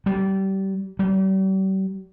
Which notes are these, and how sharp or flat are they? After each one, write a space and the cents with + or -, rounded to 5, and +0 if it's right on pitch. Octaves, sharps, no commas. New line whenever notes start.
G3 -25
G3 -40